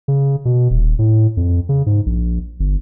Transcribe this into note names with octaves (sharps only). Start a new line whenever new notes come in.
C#3
B2
D#1
A2
F2
C#3
G#2
A#1
G1